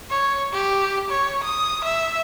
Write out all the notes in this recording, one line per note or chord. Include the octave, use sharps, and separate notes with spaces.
C#5
G4
C#5
D#6
E5